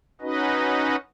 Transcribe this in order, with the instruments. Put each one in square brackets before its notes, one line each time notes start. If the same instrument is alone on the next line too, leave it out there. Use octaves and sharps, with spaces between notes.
[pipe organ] C#4 D#4 F#4 B4 D#5